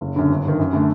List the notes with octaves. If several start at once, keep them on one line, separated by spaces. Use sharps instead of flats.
F#1
F#2 D3
G1
G2 D#3
F#2
D3 A3